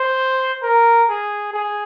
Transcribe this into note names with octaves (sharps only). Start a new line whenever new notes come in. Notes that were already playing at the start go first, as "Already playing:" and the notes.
Already playing: C5
A#4
G#4
G#4